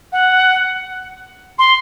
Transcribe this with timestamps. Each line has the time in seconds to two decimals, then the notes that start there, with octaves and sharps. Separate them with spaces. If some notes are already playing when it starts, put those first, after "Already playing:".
0.12 F#5
1.58 C6